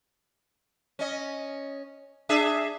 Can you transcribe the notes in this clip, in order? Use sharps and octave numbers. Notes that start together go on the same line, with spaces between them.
C#4 D#5
D4 G#4 E5